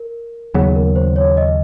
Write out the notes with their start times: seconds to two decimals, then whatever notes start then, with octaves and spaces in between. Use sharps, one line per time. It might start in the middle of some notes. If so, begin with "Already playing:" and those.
Already playing: A#4
0.54 D#2 C#3 F#3 B3 G#4
0.76 A#4
0.96 C5
1.16 C#5
1.37 D#5